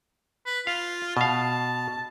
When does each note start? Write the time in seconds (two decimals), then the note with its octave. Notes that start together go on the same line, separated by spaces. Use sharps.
0.46 B4
0.67 F4 F5
1.17 B2 F5 A5